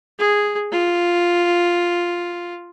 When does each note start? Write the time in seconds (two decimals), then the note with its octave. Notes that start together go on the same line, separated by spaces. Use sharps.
0.19 G#4
0.72 F4